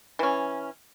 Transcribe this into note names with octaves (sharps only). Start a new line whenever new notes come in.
E3 C#4